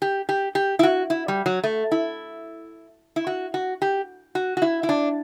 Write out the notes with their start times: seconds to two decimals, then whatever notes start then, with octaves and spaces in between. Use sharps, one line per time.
0.02 G4
0.29 G4
0.55 G4
0.79 E4
0.83 F#4
1.10 E4
1.28 G3
1.46 F#3
1.64 A3
1.92 E4
3.16 E4
3.27 F#4
3.54 F#4
3.82 G4
4.35 F#4
4.57 F#4
4.62 E4
4.83 E4
4.89 D4